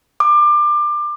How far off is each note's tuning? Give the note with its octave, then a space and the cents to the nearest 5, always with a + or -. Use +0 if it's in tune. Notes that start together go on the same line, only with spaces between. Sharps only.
D6 +25